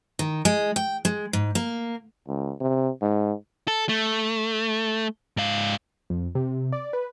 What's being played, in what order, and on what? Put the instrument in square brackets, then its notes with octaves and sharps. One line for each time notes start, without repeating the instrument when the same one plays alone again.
[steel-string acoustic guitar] D#3
G#3
G5
G#3
G#2
A#3
[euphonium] C#2
C3
G#2
[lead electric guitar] A4
A3
G#2 F5
[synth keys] F2
C3
D5
B4